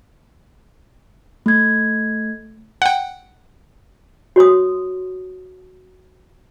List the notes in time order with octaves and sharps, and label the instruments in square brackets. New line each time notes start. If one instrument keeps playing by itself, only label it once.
[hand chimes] A3 G#6
[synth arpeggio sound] F#5 G5
[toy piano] F#4 C#5 C6 D#6